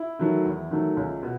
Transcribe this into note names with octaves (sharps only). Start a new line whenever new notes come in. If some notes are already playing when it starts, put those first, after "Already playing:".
Already playing: E4
D#3 F#3 A3
E2
D#3 F#3 A3
C#2
B2